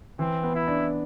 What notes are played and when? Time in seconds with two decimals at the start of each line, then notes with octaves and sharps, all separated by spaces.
0.19 E3 C4
0.44 B3
0.55 E4
0.68 D4